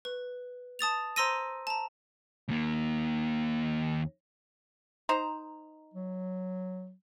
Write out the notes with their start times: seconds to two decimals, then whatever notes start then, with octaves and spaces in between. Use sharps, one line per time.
0.05 B4
0.79 A5 D#6 A6 F7
1.16 C5 A#5 C6 E6 A#6 D#7
1.67 A5 A#5
2.49 D#2 A#3
5.09 D#4 C5 A#5
5.94 F#3